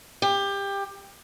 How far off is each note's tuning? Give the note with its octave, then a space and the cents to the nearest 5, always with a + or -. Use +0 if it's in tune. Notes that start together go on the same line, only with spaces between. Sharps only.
G4 +20